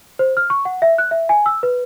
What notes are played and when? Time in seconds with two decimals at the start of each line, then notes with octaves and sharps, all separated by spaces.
0.19 C5
0.37 F6
0.50 C#6
0.65 F#5
0.82 E5
0.98 F#6
1.11 E5
1.29 G#5
1.46 E6
1.63 B4